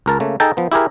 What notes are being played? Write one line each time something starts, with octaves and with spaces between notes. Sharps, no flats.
C#2 A#4 A5
C#3 A3 A#3
D#4 G#4 A4 G5 A5 A#5
F3 B3
E4 G4 G#4 A#4